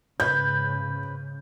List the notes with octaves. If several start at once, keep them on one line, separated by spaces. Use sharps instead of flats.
G#2 C#3 B4 G6